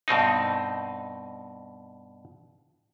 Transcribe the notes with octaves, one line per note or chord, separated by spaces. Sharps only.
G2 B2 C4 D#4